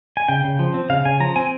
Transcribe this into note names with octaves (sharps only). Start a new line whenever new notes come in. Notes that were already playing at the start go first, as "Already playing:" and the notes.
G#5
C#3 G5
C#3
F3
C4
C#3 F5
C#3 G#5
F3 A#5
C4 G#5